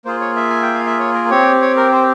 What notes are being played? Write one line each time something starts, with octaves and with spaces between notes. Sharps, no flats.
A#3 F4 G#4 C5
C#5
E5
G#5
G5
F5
E5
C#5
A#4
C4 G4 C#5
C#5
A#4
C5